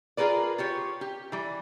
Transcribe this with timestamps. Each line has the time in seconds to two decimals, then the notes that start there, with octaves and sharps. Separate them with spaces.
0.17 F4 G#4 A#4 B4 D5
0.58 F4 G4 C#5
1.01 G4
1.32 E3 G3